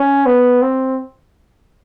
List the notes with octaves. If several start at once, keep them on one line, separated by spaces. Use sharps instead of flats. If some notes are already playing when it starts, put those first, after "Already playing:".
Already playing: C#4
B3
C4